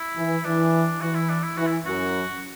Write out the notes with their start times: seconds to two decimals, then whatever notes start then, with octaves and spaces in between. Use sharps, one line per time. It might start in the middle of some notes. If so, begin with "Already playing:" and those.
Already playing: E4
0.16 E3
0.45 E3 D4
1.01 E3 F#4
1.15 E4
1.29 D4
1.43 E4
1.57 E3 F#4
1.67 E4
1.85 F#2 F#4